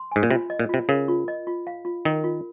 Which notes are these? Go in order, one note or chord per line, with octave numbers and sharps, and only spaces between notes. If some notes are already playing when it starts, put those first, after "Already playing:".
Already playing: C6
G#2 G#5
A#2
C3 F4
D#5
A#2
C3 F4
C#3 A#4
F4
D#5
F4
F5
F4
D#3 A#4
F4